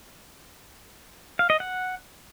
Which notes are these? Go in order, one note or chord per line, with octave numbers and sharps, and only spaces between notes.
F5
D#5
F#5